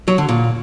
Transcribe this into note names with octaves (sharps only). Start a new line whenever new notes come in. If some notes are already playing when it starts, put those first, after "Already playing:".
F#3
D3
A#2